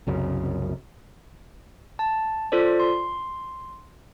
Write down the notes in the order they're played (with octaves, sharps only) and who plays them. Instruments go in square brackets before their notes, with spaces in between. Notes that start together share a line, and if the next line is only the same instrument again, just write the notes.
[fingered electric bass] C2 F#2 C#3
[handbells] A5
F4 A4 C5 D5
C6